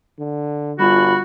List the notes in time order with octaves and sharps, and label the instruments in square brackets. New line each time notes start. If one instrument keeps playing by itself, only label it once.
[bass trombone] D3
[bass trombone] G1 [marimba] G3 F4 [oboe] F#4 [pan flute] B5